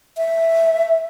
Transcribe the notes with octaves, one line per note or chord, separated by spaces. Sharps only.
E5